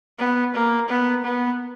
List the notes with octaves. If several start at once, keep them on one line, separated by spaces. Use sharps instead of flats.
B3
A#3
B3
B3